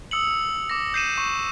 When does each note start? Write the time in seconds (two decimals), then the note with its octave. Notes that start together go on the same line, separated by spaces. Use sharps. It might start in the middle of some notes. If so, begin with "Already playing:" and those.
0.11 D#6 E6 C#7 F#7
0.70 D6 A#6
0.94 G6 C7 D#7 E7
1.18 C#6